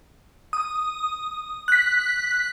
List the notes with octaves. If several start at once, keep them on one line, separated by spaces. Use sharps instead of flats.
D#6
F#6 B6